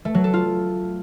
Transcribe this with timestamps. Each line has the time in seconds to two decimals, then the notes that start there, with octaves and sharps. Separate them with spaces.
0.05 A3
0.15 F#3
0.24 A4
0.33 F4